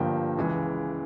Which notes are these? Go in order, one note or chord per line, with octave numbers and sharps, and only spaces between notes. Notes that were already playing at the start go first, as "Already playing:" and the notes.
Already playing: G1 G2 F3 A#3 G5
C#2 C#3 E3 G#3